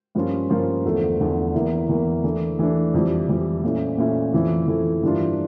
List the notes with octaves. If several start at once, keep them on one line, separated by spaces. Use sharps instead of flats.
G2 F3 A#3 C#4 F4
G2 F3 A#3 C#4 F4
E2 D3 F3 A3
E2 D3 F3 A3
E2 E3 A#3 E4
E2 E3 A#3 E4
E3 A3 D4
E3 A3 D4
F2 E3 G3
F2 E3 G3
A#2 A3 C#4 E4
A#2 A3 C#4 E4
F2 E3 A3 E4
F2 E3 A3 E4
G2 E3 A#3 D4 F4